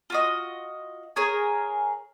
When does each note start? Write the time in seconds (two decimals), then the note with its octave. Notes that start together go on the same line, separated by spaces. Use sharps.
0.10 F4 F#4 D#5
1.16 G#4 A#4 C#5 G#5